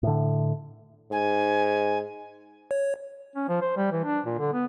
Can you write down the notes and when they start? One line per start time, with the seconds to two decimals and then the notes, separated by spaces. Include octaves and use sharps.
0.03 A2 D3
1.12 G#2 G#5
2.71 C#5
3.36 C#4
3.49 F3
3.61 C5
3.77 G3
3.92 E3
4.05 D4
4.26 A#2
4.39 D3
4.53 B3